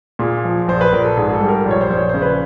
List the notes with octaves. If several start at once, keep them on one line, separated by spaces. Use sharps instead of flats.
A#2 G#4
F3
A#1 C5
B4
A#1 A#4
A4
G#2 G#4
G#4
A4
G3
A#4
A#1
C#5
C5
A#1
C#5
C#3 C5
B4